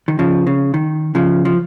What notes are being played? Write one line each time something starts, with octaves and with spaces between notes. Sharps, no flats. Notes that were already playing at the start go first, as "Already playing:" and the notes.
D#3
C#3 F3
C#3
D#3
C#3 F3
F3